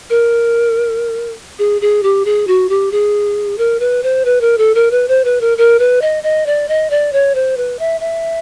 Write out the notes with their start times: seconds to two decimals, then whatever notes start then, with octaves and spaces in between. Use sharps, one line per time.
0.10 A#4
1.59 G#4
1.82 G#4
2.03 G4
2.25 G#4
2.47 F#4
2.69 G4
2.92 G#4
3.58 A#4
3.80 B4
4.03 C5
4.25 B4
4.41 A#4
4.58 A4
4.75 A#4
4.91 B4
5.08 C5
5.24 B4
5.41 A#4
5.58 A#4
5.79 B4
6.02 D#5
6.23 D#5
6.46 D5
6.68 D#5
6.90 D5
7.13 C#5
7.35 C5
7.57 B4
7.79 E5
8.01 E5